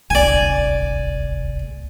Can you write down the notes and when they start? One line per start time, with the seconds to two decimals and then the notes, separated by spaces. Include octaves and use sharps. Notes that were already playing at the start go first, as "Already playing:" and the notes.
0.10 D1 G1 C2 D5 G#5